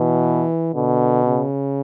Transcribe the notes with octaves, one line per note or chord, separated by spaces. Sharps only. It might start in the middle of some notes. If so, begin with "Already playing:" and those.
Already playing: B2 E3
B2 D3
C#3